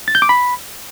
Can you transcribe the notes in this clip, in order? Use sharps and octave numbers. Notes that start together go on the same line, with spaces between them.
A6
G6
D6
B5